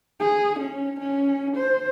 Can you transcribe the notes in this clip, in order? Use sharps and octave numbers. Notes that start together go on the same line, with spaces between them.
G#4
C#4
C#4
C5